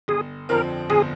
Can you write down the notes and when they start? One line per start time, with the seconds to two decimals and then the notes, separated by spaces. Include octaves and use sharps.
0.08 G1 G#4
0.49 F2 D3 F3 C4 A#4
0.90 G1 G#4